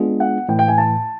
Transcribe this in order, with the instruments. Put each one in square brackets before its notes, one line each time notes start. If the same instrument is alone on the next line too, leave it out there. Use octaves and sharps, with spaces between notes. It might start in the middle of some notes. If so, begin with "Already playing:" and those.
Already playing: [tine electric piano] G#3 B3 D4 F4 G#4
[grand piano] F#5
[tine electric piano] A2 E3 A3 [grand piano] G5
[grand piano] G5
G#5
A5